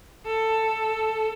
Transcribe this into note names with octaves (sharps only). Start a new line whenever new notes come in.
A4